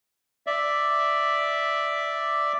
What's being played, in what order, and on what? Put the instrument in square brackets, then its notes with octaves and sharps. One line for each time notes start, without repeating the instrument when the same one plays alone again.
[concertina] D5 E5